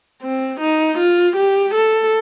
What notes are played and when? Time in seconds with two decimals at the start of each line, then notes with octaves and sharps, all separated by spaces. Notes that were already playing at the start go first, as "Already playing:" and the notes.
0.23 C4
0.60 D#4
0.98 F4
1.36 G4
1.74 A4